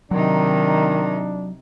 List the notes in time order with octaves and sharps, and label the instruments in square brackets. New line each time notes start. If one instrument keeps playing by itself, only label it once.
[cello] C3 D#4 [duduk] D#3 [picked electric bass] F#3 [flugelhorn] D4